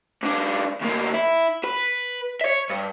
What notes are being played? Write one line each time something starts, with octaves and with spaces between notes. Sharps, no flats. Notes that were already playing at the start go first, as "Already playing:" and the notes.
G#2 D4
D2 A#3
E4
B4
C#5 E5
G2